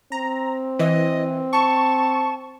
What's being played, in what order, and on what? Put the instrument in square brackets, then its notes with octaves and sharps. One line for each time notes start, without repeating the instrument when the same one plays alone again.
[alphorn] C4 [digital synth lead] A#5
[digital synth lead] E3 [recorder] D#5
[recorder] A5 [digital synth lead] C#6